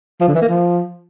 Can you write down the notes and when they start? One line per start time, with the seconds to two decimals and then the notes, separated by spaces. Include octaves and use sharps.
0.21 F3
0.28 D3
0.35 E3
0.42 A#3
0.49 F3